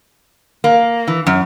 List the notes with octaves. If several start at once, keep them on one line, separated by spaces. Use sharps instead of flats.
A#3
E3
F#2